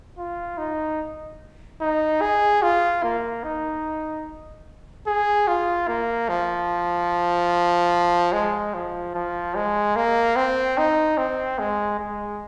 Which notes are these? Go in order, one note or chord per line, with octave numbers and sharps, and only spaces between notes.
F4
D#4
D#4
G#4
F4
A#3
D#4
G#4
F4
A#3
F3
G#3
F3
F3
G#3
A#3
C4
D#4
C4
G#3
G#3